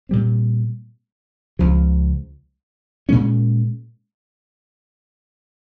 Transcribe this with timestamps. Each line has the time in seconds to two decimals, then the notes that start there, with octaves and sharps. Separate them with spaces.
0.09 A#2 G3 C4
1.59 C#2 C#3 F3
3.09 A#2 G#3 C#4